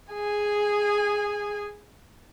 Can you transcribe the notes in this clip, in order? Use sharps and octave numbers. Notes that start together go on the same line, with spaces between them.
G#4 G#5